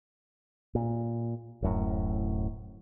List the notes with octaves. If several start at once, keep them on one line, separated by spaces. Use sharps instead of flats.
A#2
D1 F#2 A2